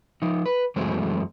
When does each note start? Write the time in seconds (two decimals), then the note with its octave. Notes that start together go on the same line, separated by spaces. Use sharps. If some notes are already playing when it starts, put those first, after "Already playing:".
0.22 F3 D#4
0.46 B4
0.76 F#2 E3 F#3 G#3 A3 C4